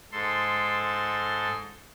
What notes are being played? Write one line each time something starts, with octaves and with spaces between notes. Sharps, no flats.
G#2 A4 C6